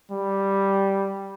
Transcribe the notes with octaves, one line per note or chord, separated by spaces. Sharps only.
G3